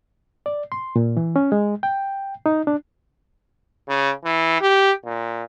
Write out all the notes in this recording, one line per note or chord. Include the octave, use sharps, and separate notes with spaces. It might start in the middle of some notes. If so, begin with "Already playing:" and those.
D5
C6
A#2
E3
C#4
G#3
G5
D#4
D4
C#3
E3
G4
A#2